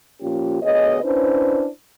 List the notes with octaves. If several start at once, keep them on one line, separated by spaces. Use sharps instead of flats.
A#2 F3 A#3 C#4 F4 G4
D2 B3 G#4 C#5 D#5
C#4 D4 E4 B4 C5